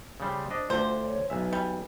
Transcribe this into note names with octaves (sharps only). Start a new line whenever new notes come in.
C#3 G3 C5
D4 C5 D#5
D2 D3 F4 C5
C#5
B1 E5 G#5
G3